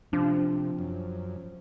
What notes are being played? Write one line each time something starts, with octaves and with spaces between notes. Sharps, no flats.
C3 F3 D4
F#2